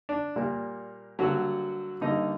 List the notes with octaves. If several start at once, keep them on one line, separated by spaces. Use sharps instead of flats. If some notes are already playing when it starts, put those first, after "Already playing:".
D4
A#2 G3 A#3
G2 D3 F#3 G3 A#3 F#4
G2 D3 G3 A#3 D#4 D#5